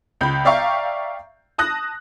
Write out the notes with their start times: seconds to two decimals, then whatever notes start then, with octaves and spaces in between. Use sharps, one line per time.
0.21 C#2 B5 G6
0.45 D5 E5 F5 G5 A#5 C#6
1.58 A5 D#6 F#6 A#6